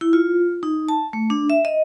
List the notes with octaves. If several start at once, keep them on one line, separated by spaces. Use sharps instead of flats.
E4
F4
D#4
A5
A3
D4
E5
D#5